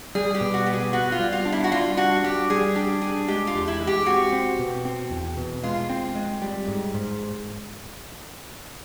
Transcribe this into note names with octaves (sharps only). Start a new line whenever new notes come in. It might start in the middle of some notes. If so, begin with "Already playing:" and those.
G3 G#4
G4
B2
F#4
B3 G4
G#4
B3 F#4
F4
G3
F4
D4
E4
F#4
G3 F4
D4 F#4
G3 G4
G3 G#4
D4 G4
D4 G#4
G#3 G4
F4
E2
E4
G#3
G4
C4 F#4
C4
B2
C4
E2
B2
G#3 F4
C4
G#3
G3
G#2
G#2